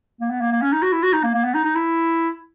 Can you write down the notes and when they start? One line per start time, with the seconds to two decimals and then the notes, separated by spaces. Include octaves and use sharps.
0.21 A#3
0.30 B3
0.41 A#3
0.52 A#3
0.62 C#4
0.72 D#4
0.82 F#4
0.93 E4
1.03 F#4
1.13 D#4
1.24 A#3
1.34 A#3
1.45 B3
1.55 D#4
1.65 D#4
1.76 E4